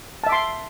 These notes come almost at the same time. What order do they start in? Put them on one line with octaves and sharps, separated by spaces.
A5 E5 D6 C6